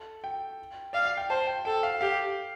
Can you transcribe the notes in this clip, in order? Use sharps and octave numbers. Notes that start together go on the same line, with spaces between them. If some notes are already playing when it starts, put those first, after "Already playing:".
Already playing: A4
G5
D5 F5
F5
G5
C5 A5
G5
A4 G5
F5
G4 F5